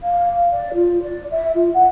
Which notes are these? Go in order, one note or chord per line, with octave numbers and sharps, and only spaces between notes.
F5
D5
F4
D5
E5
F4
F#5